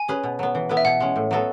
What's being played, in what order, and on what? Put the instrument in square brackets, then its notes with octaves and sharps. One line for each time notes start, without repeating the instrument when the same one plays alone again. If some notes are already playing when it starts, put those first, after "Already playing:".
Already playing: [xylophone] G#5
[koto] C#4 G#4 B4
B2
F#3 B3
E3
B3 E4 B4
[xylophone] E5
[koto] B2 [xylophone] F#5
[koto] G#3 C#4
A2
F#3 B3 F#4 A4